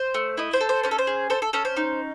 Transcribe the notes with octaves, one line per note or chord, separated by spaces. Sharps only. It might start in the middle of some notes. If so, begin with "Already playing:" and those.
Already playing: C5
A3
E4 D#5
C5
A4
C5
C#4 C5
A4
C5
G#4
A4 C5
A4
C#4 A4
C5
D#4